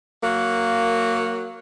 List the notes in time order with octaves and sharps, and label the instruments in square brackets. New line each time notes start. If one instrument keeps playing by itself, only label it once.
[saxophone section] F#3 A#3